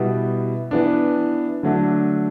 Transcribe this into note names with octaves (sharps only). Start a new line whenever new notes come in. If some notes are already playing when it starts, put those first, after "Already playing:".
Already playing: B2 G3 B3 E4
E3 B3 D4
D3 F#3 A3 D4